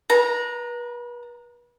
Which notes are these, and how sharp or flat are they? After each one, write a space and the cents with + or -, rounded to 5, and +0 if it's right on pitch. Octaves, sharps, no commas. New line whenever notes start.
B4 -35 A#5 +0